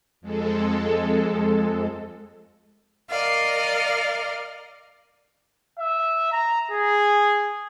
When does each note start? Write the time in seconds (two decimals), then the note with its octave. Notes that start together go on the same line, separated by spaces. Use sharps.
0.21 F2 G#3 A4
3.09 A#4 D5 D#5 F5
5.79 E5
6.32 A#5
6.71 G#4